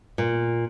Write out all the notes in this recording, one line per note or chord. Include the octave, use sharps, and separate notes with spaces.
A#2